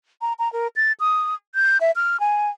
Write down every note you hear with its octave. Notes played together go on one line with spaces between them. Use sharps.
A#5
A#5
A#4
A6
D#6
G6
E5
F6
G#5